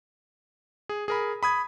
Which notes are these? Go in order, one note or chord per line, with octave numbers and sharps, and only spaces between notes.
G#4
G#4 A#4 B5
B5 D#6 G#6